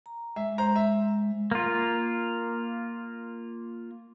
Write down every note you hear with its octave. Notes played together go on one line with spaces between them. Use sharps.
A#5
G#3 E5
C5 A#5
E5
A#3 F4